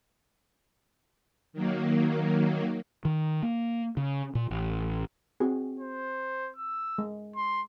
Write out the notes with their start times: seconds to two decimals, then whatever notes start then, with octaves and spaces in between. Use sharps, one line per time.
1.53 D#3 F#3 A#3
3.05 D#3
3.43 A#3
3.97 C#3
4.35 A#2
4.51 A1
5.40 C4 F#4 G#4
5.80 C5
6.57 E6
6.98 G#3
7.36 C6